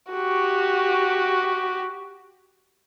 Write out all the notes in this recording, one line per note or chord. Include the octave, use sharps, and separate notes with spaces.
F#4 G4